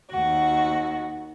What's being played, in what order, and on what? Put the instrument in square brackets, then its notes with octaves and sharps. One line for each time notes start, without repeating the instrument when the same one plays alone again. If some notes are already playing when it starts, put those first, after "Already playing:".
[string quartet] D#2 F#4